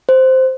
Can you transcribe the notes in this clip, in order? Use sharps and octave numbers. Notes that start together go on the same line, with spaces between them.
C5